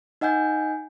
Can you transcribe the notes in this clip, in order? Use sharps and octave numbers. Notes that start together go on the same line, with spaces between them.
D#4 D#5 F#5 G#5 G6